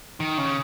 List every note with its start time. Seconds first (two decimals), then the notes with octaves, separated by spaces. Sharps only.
0.20 D#3
0.38 C#3